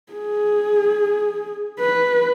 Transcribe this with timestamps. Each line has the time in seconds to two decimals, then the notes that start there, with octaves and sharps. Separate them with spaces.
0.13 G#4
1.80 B4